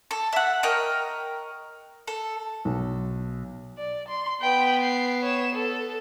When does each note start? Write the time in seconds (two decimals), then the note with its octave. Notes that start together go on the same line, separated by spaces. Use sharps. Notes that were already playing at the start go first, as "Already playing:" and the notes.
0.11 A4
0.33 E5 F#5
0.63 A#4 C#5 D#5 G5
2.07 A4
2.65 B1
3.78 D5
4.08 C6
4.41 B3 G5 B5
4.82 C7
5.23 C#5 E7
5.55 A4